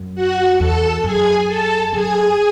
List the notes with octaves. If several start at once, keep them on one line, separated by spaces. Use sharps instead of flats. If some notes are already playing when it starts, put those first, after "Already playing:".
Already playing: F#2
F#4 F#5
E2 A4 A5
F#2 G#4 G#5
A4 A5
F#2 G#4 G#5